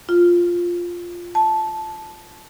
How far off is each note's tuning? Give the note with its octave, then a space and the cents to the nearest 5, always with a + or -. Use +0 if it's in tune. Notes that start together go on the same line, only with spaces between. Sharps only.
F4 +0
A5 -10